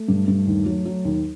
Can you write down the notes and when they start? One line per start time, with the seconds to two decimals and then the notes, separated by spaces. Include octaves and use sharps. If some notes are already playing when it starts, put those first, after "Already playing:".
Already playing: A3
0.08 G2
0.28 G2
0.47 D#2
0.66 F#3
0.85 F#3
1.05 D#2